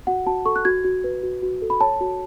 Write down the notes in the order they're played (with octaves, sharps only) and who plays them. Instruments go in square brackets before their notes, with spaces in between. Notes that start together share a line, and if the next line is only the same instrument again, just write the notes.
[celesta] F#4 F#5
F#4 A5
A4 C#6
F#6
F#4 G#6
F#4
B4
F#4
F#4
A4
B5
C#5 A5
F#4